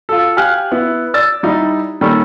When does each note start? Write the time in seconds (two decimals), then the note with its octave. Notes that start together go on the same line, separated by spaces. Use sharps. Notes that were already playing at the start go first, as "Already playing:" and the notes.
0.09 F4 A4
0.37 G4 F5 G#5 F6 F#6
0.72 B3 E4
1.14 D5 E6 A6
1.43 G3 D#4 E4
2.01 A#2 D#3 G3 C#4 A4